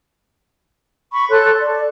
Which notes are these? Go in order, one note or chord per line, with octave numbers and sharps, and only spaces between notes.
B5 C#6
A4 C#5 C6 F#6
D5